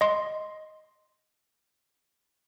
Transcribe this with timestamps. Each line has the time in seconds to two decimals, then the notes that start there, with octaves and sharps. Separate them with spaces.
0.01 D#5 C6